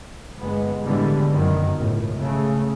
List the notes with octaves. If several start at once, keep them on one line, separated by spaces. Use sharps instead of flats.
G1 G2 G#3 B3
A2 D3 E3 G3 G#3 B3
G1 F#2 B2 D#3 F#3
C#2 A2
C#3 A3